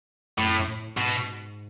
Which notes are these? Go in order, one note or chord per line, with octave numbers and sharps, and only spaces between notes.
F#2 A2
F2
F#2
A2
G#2 B2